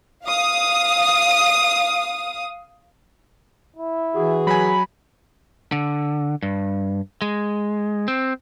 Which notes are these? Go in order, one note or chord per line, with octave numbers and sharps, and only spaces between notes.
F5 D#6
E4
E3 F#4 G#4
F#3 G#5 B5
D3
G2
G#3
C4